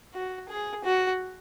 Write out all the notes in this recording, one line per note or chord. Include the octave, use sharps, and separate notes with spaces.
F#4
G#4
F#4